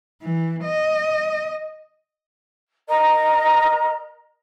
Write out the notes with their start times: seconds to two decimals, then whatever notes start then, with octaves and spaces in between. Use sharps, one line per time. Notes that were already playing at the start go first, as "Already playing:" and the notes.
0.22 E3
0.64 D#5
2.87 A#4 D#5 A#5